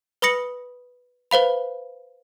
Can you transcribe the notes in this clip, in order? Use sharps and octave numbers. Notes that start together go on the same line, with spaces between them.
B4 B5 D#6 A#6 C#7 F#7
B4 C5 F5 B5